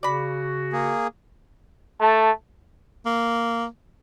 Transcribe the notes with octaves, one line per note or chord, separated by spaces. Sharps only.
C#3 F#4 D5 B5
A#3 G#4
A3 A5
A#3